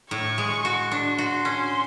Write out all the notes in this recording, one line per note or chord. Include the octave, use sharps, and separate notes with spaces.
A2 C#6
G#3
F#4
D4
F#4 C6
C#4